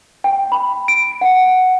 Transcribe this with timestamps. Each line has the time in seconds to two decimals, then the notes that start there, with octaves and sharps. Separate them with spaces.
0.24 G5
0.52 B5
0.88 D7
1.21 F#5